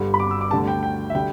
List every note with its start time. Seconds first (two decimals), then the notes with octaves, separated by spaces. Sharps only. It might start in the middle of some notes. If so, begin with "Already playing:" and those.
Already playing: G1 G2 D3 G3
0.14 B5
0.20 D6
0.31 E6
0.41 D6
0.51 D2 D3 G3 A5
0.68 G5
0.83 G5
1.10 E5
1.15 D3 G3 G5